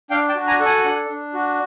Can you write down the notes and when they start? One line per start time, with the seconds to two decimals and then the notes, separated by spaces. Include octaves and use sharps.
0.10 D4 F5 G5
0.29 G5 A5
0.35 F#4
0.47 G#5 A#5
0.59 A4
0.66 F#5 G#5
0.84 D4
1.09 D4
1.34 F#4